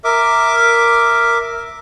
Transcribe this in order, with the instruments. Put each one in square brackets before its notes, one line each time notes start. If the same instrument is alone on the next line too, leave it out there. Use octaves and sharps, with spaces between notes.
[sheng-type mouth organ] A#4 E5 D6